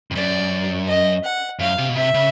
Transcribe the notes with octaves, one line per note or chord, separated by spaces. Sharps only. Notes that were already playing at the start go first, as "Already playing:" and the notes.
F2
F#2 D5
D#5
F#5
F#2 F5
C3
B2
C3 E5
C#3